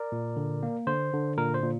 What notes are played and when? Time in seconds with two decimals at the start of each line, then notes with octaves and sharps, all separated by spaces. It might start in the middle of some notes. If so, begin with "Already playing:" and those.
Already playing: A#4 D5
0.12 A#2
0.37 D3
0.63 A#3
0.87 D3 C5
1.13 D3
1.38 A#2 A#4
1.54 C5
1.63 A#2